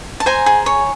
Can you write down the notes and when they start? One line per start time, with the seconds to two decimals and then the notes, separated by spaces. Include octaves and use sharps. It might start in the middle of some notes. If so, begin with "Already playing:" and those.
0.20 A5
0.26 C5 G#5 A#5
0.46 G#4
0.66 C#5